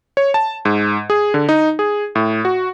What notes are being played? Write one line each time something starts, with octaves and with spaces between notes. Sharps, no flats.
C#5
A5
G#2
G#4
D3
D#4
G#4
A2
F#4